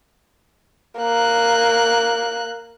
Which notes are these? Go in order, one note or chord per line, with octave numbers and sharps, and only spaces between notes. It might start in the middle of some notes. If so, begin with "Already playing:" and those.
A#3 F#6